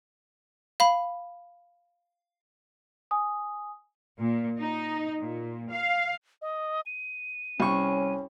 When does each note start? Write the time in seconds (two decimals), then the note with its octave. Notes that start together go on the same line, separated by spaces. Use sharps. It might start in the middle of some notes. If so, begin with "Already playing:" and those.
0.80 F5 B5
3.11 G#5 D#6
4.20 A#2
4.58 D#4
5.20 A#2
5.70 F5
6.42 D#5
6.86 D#7
7.60 C2 C#4 C#6